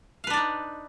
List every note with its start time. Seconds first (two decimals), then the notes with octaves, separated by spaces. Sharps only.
0.24 F5
0.27 B4
0.30 D4
0.33 D5
0.37 D#4